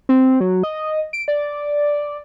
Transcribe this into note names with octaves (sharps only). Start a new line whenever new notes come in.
C4
F#3
D#5
D7
D5